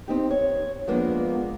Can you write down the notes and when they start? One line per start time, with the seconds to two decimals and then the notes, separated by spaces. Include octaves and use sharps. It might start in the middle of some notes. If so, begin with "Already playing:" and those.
0.08 C4 D#4 G4
0.31 C#5
0.88 F3 G#3 A#3 B3 D4 A#4